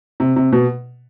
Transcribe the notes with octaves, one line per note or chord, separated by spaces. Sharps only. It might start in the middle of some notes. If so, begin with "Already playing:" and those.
C3
C3
B2